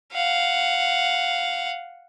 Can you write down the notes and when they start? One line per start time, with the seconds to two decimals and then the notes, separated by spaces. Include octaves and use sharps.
0.13 F5 F#5